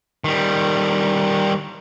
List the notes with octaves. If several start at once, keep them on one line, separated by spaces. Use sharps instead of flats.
D#3 G3